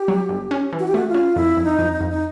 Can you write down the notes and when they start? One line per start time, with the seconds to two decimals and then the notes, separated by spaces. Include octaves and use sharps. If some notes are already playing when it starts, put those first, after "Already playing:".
Already playing: G4
0.08 F#3
0.29 G1
0.51 C#4
0.73 E3
0.79 F#4
0.88 G4
0.94 A3 F#4
1.08 F4
1.14 C#4
1.36 F2 E4
1.57 F2
1.64 D#4
1.79 F2
1.93 D#4
2.01 F2
2.10 D#4